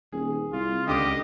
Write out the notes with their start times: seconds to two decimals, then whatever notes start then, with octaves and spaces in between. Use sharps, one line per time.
0.12 D#1 G#4
0.53 C2 F4
0.87 C#2 D3 G4 D#5 D6 D7